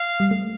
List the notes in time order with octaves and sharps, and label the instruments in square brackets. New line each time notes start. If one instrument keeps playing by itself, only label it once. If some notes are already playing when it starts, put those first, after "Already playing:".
Already playing: [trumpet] F5
[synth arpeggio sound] G3
A3